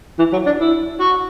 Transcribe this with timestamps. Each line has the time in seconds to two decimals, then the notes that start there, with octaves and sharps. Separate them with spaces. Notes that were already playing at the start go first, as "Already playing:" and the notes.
0.19 E3
0.33 F#3
0.46 D4
0.60 E4
0.99 F#4